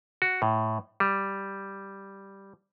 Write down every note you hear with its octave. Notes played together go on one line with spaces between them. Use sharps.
F#4
A2
G3